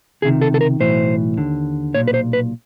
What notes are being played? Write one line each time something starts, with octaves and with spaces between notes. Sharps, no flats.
C#2 C3 D#3 G#4
A4
A4
A#4
B1 A2 E3 C5
D#2 D3
B1 A#2 C#5
B4
C5
B4